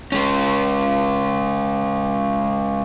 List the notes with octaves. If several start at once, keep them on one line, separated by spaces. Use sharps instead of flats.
G#3 C#4